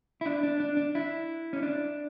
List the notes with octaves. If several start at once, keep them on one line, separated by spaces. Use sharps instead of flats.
E4
D4
D4
D4
D4
E4
C#4
D4